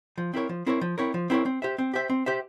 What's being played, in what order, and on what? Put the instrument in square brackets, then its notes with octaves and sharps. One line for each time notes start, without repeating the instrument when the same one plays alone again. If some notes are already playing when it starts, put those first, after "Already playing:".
[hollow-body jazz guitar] F3
C4 E4 A#4 C#5
F3
C4 E4 A#4 C#5
F3
C4 E4 A#4 C#5
F3
C4 E4 A#4 C#5
C4
G4 C5 E5
C4
G4 C5 E5
C4
G4 C5 E5